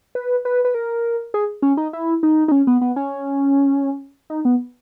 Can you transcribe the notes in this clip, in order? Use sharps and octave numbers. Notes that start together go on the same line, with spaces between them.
B4
B4
B4
A#4
G#4
C#4
D#4
E4
D#4
D#4
C#4
B3
B3
C#4
D#4
B3